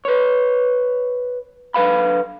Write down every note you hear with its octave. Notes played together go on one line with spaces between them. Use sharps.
B4 C#5
D3 F#3 B4 F5 B5